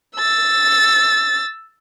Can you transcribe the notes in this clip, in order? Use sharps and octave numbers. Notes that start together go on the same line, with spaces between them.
E6 A6